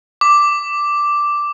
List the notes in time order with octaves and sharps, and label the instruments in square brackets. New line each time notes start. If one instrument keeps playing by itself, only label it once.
[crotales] D6